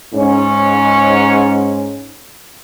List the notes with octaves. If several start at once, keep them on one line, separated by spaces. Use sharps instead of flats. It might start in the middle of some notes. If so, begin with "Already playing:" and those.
G#2 C#4